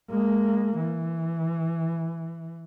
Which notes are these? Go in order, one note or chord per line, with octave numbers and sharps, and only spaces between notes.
G#3 A#3
E3